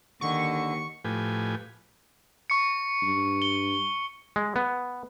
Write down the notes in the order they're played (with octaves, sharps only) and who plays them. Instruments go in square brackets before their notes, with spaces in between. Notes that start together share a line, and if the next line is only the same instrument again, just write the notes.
[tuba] D#2 [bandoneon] D3 [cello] D#3 [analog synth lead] C#6
[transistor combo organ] A2 F3 G4 B4 G#5
[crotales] C#6 C#7
[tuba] G2
[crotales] G7
[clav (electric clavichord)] G#3
B3